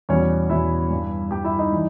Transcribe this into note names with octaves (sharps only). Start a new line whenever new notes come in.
E2 B2 G3 C#4 C#5
E2 B2 G3 E4 E5
G2 G3
G2 G3 G4 G5
E4 E5
D#4 D#5
E3 G3